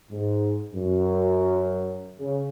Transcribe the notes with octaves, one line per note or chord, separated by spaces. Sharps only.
G#2
F#2
C#3